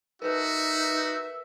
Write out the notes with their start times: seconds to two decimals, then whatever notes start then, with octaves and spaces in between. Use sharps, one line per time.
0.22 D#4 F#4 A#4 B4 E5